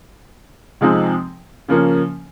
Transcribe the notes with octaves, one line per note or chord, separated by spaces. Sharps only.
C3 F3 G#3 C4 D#4
C#3 F3 A#3 C#4